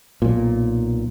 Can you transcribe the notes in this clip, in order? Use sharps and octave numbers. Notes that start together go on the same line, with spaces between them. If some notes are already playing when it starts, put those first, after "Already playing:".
B1 A#2